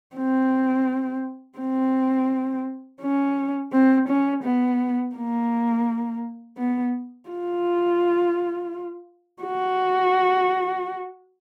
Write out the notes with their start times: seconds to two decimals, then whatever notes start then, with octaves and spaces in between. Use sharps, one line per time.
0.16 C4
1.58 C4
3.02 C#4
3.73 C4
4.09 C#4
4.44 B3
5.16 A#3
6.57 B3
7.29 F4
9.43 F#4